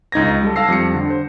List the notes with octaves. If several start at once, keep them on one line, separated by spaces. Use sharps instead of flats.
C#2 D#4 G#6 A#6
G3 A4
F5 A5 E6 A#6 C7
F2 G3 C#7
D3
C5